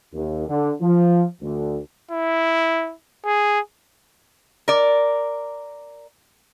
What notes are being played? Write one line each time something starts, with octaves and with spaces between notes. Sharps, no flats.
D#2
D3
F3
D2
E4
G#4
A#4 D5